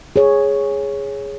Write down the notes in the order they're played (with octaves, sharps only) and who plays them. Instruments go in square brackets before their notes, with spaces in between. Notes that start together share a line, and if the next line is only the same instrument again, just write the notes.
[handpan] G#4 C#5